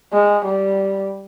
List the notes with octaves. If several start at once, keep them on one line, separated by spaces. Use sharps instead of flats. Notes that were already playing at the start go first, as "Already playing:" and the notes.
G#3
G3